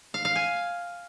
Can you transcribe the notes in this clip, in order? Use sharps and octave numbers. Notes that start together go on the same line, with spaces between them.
F5
F5
G#5